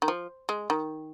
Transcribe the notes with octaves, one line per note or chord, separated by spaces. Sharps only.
D#3
F3
G#3
D#3